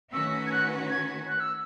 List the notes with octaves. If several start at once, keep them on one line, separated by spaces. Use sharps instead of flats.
D#3 A3 C#4 F#4 B4 E6
G#6
F#6
G#6
F#6
E6